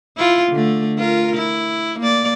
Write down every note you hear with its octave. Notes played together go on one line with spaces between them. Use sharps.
E4 F4
D3 A3
F4 A#4
E4
A#3 D5